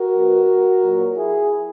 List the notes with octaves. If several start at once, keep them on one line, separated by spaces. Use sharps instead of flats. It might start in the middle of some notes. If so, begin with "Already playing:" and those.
Already playing: F#4 A#4
B2 F#3
A#2 F#3
E4 G#4